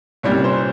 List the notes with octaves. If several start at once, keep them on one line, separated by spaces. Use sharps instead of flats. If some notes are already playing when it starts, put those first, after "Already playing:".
C2 A#2 G3 C#4 C#5
C5